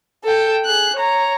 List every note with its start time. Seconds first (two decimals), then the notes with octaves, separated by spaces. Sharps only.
0.24 A4 G5
0.66 G#4 F#6
0.96 C#5 A#5